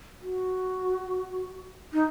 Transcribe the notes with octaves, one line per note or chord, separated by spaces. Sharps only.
F#4
D#4